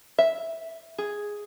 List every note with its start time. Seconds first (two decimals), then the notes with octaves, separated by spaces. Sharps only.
0.18 E5
0.98 G#4